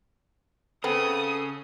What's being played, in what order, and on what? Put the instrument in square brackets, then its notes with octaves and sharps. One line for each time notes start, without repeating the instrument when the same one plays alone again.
[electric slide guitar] C#3 [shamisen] B3 C4 [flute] A4 [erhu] D#6